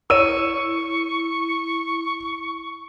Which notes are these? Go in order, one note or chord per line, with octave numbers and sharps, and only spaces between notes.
E4 A#4 C#5 C#6 E6 D#7